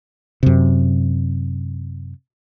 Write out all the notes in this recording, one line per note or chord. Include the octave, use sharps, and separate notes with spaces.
F#2 C3